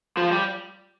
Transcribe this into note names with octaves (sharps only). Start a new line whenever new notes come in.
F3
G3